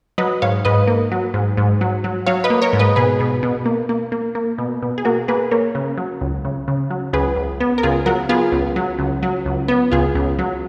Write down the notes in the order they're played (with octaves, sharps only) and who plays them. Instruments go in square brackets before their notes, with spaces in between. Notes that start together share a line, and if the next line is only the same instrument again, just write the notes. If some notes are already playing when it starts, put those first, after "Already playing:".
[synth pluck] F#3 B4 D#5
G#2 C#5 F5
G#2 B4 D#5
A#3
F#3
G#2
G#2
F#3
F#3
F#3 C#5 F5
B4 D#5
A#3
A#4 C#5
G#2
B4 D#5
B2 G#4 B4
B2
B2
A#3
A#3
A#3
A#3
B2
B2
G#4
A#3 F#4 A#4
A#3 G#4 B4
A#3 A#4 C#5
C#3
F#3
C#2
C#3
C#3
F#3
C#2 G#4 B4
C#2
B3
A#4
C#2 F4 G#4
F#3 F#4 A#4
B3 F4 G#4
C#2
F#3
C#2
F#3
C#2
B3
C#2 F4 G#4
C#2
F#3